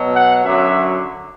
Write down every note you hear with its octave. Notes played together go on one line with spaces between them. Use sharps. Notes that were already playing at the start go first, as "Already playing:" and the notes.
Already playing: B2 F#3
F#5
F#2 D3 F#3 E5